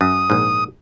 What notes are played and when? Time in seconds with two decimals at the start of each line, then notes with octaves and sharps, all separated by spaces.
0.01 F#2 D#6
0.30 A#1 G#2